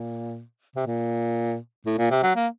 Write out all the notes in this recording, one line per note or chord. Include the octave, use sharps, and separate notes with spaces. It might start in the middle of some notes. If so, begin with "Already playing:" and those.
Already playing: A#2
C3
A#2
A2
A#2
C3
F#3
A#3